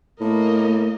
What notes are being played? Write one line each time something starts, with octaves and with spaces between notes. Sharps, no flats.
A2 A#3 D#5